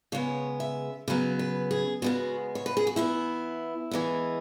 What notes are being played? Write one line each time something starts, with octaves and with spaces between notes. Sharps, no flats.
C#3 G#3 B3 C#5
E5
C#3 F#3 B3 B4
B4
G#4
C#3 G#3 B3 F#4
C#5
B4
G#4
F#4
E3 B3 E4
E3 G#3 B3